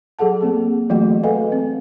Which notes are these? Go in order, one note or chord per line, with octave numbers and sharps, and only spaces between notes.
F#3 G#4 A4 F#5 A5
A#3 C4 G#4
E3 F#3 A3 F#4 D#5 G5
A4 B4 D#5 F5 F#5 G#5
C4